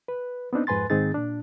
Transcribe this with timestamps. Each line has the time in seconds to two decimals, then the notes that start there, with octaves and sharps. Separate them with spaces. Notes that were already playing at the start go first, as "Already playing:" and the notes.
0.08 B4
0.53 B3 C4 D4 D#4
0.67 F2 G#2 B4 G#5 C6 A6
0.90 G#2 D#3 C4 D#4 G#4 A6
1.14 A#2 D4